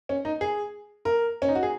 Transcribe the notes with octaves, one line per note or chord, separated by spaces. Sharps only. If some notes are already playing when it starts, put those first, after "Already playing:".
C#4
D#4
G#4
A#4
C#4
D#4
F#4
G#4